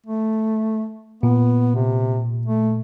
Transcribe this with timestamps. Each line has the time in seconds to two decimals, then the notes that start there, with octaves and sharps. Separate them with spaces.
0.07 A3
1.23 A#2 B3
1.75 C3
2.46 A3